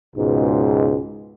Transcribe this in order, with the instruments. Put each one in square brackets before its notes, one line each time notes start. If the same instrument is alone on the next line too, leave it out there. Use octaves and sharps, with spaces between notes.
[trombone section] C#2 G#2 B2